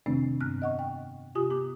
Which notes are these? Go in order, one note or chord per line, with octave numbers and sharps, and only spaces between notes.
F2 C3 D#3 A3 C4 D4
G2 B3 F6 F#6
D#5 F#5 C#6
G5
C3 F4 G4 G#5 D#6
B3 G4 D6